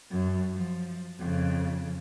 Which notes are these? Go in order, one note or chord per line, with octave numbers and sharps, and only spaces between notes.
F#2
F3
F2 C#3